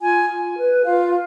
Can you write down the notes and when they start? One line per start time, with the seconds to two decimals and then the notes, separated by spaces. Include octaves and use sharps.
0.01 F4 G#5
0.29 F4
0.56 B4
0.83 F4 F5